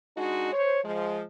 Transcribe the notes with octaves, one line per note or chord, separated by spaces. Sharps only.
G#3 D4 D#4 F#4
C5 C#5
F3 G#3